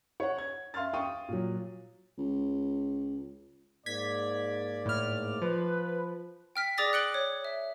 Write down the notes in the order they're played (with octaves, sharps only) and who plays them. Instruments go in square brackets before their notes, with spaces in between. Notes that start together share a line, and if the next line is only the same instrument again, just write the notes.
[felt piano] C#5 F#5
G#6
E5 F5 C6 F6 A6
F5 G5 C#6 D#6 D#7
A#2 F#3
[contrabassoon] C#2
[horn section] G#2 A#3 D5 [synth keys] G#6 B6
[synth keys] A2 F6
[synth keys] F3 [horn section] B4
[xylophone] G5 F6 B6
G#4 D5 D6 D#6 A6 A#6
F#6 C#7 D7 F#7 G7
C#5
E5